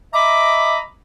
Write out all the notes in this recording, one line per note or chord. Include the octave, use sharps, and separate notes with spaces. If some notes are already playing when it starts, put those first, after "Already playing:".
D#5 E5 A#5 B5 D6